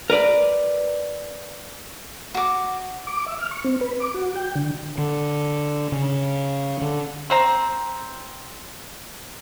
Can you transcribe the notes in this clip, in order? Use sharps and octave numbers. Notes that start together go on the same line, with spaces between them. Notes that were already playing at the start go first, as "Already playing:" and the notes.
A#4 B4 D5
F#4 D6
D6
E5
F6
C#6
C4
B4
D6
F#4
G5
D3
D3
C#3
D3
C4 C5 A#5